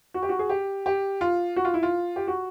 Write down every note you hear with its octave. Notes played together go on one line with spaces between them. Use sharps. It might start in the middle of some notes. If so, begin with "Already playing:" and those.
F#4
G4
F#4
G#4
G4
G4
F4
F#4
F4
E4
F4
G4
F#4